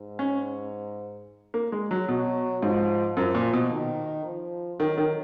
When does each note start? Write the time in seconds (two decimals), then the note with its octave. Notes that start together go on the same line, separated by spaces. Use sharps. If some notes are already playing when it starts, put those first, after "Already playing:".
Already playing: G#2
0.19 C#4
1.54 A#3
1.72 G#3
1.91 F#3
2.08 B2 F#3
2.62 G#2 F3
3.17 F#2 F3
3.35 A#2
3.53 B2
3.71 D#3
4.25 F3
4.79 D#3 F#3
4.98 D#3